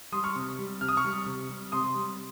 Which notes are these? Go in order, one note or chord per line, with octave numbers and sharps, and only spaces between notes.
G3 C6 D#6
C#6 F6
C3
G3
C3 F6
D#6
C#6 F6
G3
C3
G3
C3 C6 D#6
G3